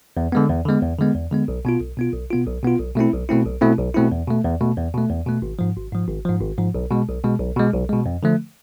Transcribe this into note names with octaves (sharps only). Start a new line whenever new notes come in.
E2
D3 G#3 B3
E2
D3 G#3 B3
E2
D3 G#3 B3
E2
D3 G#3 B3
B1
B2 B3 F4
B1
B2 B3 F4
B1
B2 B3 F4
B1
B2 B3 F4
B1
B2 A3 C4 E4
B1
B2 A3 C4 E4
B1
B2 A3 C4 E4
B1
B2 A3 C4 E4
E2
B2 A3
E2
B2 A3
E2
B2 A3
E2
B2 A3
G#1
G#2 F3
G#1
G#2 F3
G#1
G#2 F3
G#1
G#2 F3
B1
B2 G#3
B1
B2 G#3
B1
B2 G#3
B1
B2 G#3
F2
D3 F3 A3